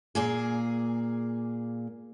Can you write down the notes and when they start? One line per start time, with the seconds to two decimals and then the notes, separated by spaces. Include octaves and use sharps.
0.15 A#2 A#3 G#4